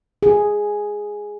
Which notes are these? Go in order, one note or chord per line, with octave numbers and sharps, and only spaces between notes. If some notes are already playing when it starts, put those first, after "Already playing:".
G#4